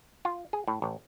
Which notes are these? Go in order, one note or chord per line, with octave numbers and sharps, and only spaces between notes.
F4
G#4
A2
A1